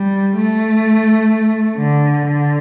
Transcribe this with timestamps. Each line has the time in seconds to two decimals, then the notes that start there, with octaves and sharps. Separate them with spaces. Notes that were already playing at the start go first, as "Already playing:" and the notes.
Already playing: G3
0.36 A3
1.77 D3
2.25 D3